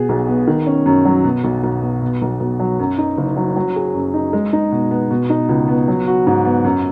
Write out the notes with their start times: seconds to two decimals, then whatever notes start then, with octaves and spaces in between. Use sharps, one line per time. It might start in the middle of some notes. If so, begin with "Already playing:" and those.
Already playing: B2 G#4
0.09 B1
0.28 B3
0.47 D#3
0.66 C#4
0.86 F#2
1.05 F#3
1.24 B2
1.44 B1
1.64 B1
1.82 B3
2.02 B2
2.22 B1
2.40 B1
2.59 F#3
2.79 F#2
2.98 D#4
3.18 F#1
3.37 F#3
3.56 F#3
3.76 G#4
3.95 F#2
4.14 D#4
4.33 G#3
4.53 D#4
4.72 B2
4.91 B3
5.11 B2
5.30 D#4
5.49 C#2
5.68 B3
5.88 F#3
6.07 F#4
6.27 G#2
6.45 B3
6.65 F#2